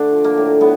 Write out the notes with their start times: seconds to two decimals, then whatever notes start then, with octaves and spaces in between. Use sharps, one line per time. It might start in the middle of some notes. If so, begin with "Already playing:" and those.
Already playing: D3 A3 D4
0.13 F3
0.24 A#3
0.37 A2
0.61 A2 B3